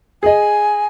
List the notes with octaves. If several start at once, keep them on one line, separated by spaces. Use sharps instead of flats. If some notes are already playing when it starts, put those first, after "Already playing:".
G#4 D#5 G#5